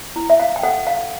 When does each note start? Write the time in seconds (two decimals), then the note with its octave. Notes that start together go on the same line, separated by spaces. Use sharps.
0.16 E4
0.30 E5
0.40 F5
0.56 G5
0.63 A4 F#5
0.87 F5